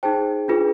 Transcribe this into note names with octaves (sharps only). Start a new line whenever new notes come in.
D#4 G#4 C5 G5 A5
D4 F4 G#4 B4